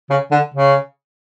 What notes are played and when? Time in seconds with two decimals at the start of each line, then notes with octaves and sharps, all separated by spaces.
0.10 C#3
0.31 D3
0.54 C#3